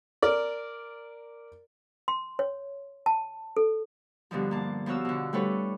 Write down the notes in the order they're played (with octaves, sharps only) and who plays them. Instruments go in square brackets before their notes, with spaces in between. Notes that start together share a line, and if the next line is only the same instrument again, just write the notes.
[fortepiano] A#4 D5
[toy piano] C6
C#5
A5
A4
[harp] G2 B2 D3 F3
A#3 A5
F3 B3 F4 F#4 C#5 E6
B2 D3
G3 A3 D4 A4 B4 C#5